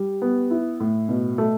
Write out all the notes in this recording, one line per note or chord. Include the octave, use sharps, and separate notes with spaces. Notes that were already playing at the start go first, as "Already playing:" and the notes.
Already playing: G3
B3
E4
A2
B2
A3